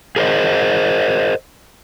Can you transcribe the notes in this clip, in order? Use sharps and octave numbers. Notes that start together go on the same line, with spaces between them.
G#4 A#4 C5 D#5